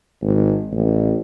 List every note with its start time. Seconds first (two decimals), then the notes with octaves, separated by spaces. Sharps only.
0.22 G#1
0.72 A1